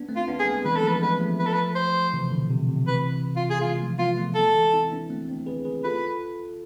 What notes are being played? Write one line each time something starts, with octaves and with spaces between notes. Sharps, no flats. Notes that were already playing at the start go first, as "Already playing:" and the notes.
Already playing: B3 D4
A3 C4
F4
B3 D4
G#4
G#3 B3
E3 G#3 B4
A4
F3 A3 B4
G#3 B3 B4
F3 A3
B4
A4
B4
C5
C3 E3
B2 D3
C3
C3
C3 E3 B4
F4
G#4
E3 G#3 F4
F3 A3
G#3 B3 F4
F3 A3
A4
E3 G#3
C4 E4
B3 D4
A3 C4
A3 C4
G#4 B4
G#4 B4
F4 A4 B4